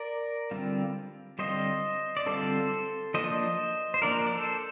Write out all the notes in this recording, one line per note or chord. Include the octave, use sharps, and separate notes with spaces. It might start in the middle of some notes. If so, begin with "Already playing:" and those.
Already playing: A#4 D5
D3 G3 C4 F4
D3 G3 C4 F4 C5 D#5
D5
D3 G3 C4 F4 A4 C5
F3 A#3 D4 C5 D#5
C5
F3 A#3 D4 A#4 D5
D5
A4 C5